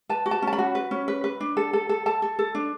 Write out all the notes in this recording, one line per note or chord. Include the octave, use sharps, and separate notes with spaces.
B4 A5
F#4
A5
C#4 A5
B5
F#4
B4
C#4
B4
B4
D4
A4
A4
A4
A4 A5
A4
A4
D4